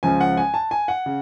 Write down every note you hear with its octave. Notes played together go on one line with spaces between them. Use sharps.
C#2 C#3 F3 G#5
F#5
G#5
A5
G#5
F#5
C#3